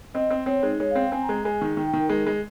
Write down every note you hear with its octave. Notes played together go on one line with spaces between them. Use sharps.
C4 D#5
C4
C4 C#5
G#3 D#4
G#3 C#5
F5
C4
G5
C4 G#5
A#5
G#3
G#3 G#5
D#3
D#3 G5
G5
D#3
A#4
G#3
G#3